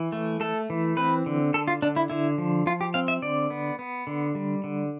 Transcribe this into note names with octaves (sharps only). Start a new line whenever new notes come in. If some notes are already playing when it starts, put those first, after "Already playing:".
Already playing: E3
A3
A3 A4
E3
C4 B4
D3
D3 A4
F4
D3 D4
E4
D3 E4
F3
F3 F4
G4
C4 F5
E5
D3 D5
B3
B3
D3
G3
D3